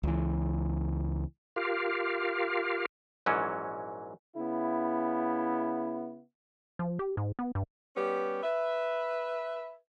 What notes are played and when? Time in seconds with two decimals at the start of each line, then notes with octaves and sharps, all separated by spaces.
0.03 C#2 E3
1.56 F4 G4 A#4 F5
3.26 A#1 G#2 E3 F#3 C#4
4.35 C#3 B3 E4
6.79 F3
6.99 G4
7.17 G#2
7.39 B3
7.55 G2
7.97 G3 B3 C#4 G4
8.43 B4 E5